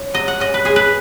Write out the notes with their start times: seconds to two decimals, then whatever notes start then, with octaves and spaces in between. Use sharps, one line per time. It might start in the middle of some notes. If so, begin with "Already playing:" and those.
Already playing: C#4
0.14 F#3 D#5
0.28 F#5
0.40 C#4 D#5
0.54 B4
0.65 G#3 G#4
0.76 B4